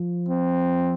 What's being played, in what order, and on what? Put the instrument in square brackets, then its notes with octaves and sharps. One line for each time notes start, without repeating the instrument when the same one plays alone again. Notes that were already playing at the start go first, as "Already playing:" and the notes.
Already playing: [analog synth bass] F3
[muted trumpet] C4